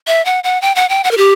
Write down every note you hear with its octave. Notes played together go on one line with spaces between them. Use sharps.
E5
F#5
F#5
G5
F#5
G5
F#5
A#4
G4